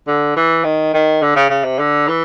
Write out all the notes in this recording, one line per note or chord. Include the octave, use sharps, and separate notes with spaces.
D3
E3
D#3
D#3
D3
C#3
C#3
C3
D3
E3